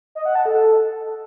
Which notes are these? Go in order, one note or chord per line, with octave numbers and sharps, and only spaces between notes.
D#5
F#5
A5
A4